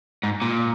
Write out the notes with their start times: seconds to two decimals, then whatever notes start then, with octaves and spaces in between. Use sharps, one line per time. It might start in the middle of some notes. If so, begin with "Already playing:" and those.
0.23 G#2
0.42 A#2